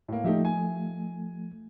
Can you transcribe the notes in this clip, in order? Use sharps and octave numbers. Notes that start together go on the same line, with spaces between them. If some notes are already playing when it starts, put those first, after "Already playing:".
A2 A#3
F3 A3 D#4 G4 E5
G#5